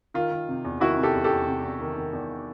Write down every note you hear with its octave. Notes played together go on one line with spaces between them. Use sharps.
D#3 F4
D#3
C3
E2
D#3 E4 F#4
C3
G4 A4
E2
G4 A4
E2
C3
E2
D#3
D#3
E2